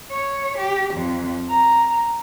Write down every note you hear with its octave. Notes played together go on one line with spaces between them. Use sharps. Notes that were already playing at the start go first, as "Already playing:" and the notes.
C#5
G4
F2
A#5